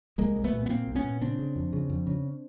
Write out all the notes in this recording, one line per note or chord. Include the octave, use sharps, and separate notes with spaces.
C2 G#3 A#3
C2
A3 B3
A#2
B3
A#2 A#3 C4
C2
B3 C#4
A#2
C#3 C4 D4
C#3
F2
C#3
F2
C#3